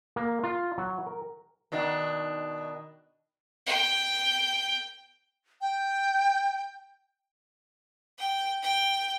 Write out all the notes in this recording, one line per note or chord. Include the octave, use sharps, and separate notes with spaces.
A#3
F4
F#3
A#4
B2 D#3 D4
G5
G5
G5
G5